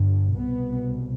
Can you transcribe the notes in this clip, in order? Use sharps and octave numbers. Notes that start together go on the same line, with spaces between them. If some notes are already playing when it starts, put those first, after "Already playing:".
Already playing: G1 G2
C2 B2 B3